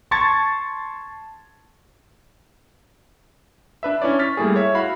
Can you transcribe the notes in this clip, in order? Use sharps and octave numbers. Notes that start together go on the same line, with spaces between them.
A5 C6 C#6 G#6 A6 C#7
D4 B4 E5
C#4 E4 C#5 D5
C#6 F6 A6 B6
G3 A3 A#3 E4 G#4
C#5 E5
E4 F#4 F5 B5